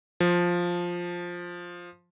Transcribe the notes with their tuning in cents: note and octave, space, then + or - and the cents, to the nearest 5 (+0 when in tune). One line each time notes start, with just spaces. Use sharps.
F3 +5